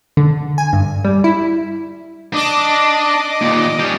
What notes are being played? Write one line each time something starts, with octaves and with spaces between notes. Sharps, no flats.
D3
G#5
G2
G3
E4
D4 D#5 D6
D#2 A#2
G3 C#4